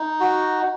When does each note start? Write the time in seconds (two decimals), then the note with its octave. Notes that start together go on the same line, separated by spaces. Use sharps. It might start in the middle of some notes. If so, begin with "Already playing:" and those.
Already playing: D#4
0.20 F#4